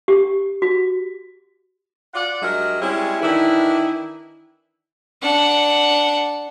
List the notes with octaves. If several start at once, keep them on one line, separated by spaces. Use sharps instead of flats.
G4
F#4
F4 D5 F#5
G2 F#3 G#3 A#4 D#5 E5
G3 G#3 C4 C#4 E4 G#4
D#3 E3 D4 E4
D4 F#5